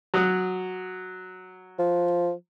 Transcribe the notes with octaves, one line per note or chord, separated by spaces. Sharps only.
F#3 D#6 F#6
F3